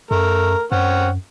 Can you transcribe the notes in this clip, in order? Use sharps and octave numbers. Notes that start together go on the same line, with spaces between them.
F#2 A3 A#4
F#2 C4 C#4 F#5